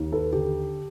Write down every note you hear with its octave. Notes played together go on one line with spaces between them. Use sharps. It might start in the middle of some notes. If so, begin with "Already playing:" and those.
Already playing: D#2
A4 B4
D3 G4 A4